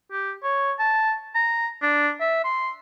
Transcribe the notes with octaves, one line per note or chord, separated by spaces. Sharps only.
G4
C#5
A5
A#5
D4
E5
C6